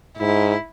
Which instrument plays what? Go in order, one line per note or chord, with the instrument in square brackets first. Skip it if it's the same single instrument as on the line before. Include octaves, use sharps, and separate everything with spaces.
[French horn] G#2 [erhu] E4